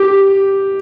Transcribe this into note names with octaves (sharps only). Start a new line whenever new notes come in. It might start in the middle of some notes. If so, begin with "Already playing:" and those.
Already playing: G4